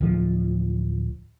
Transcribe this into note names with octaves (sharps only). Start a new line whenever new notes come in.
D1 F3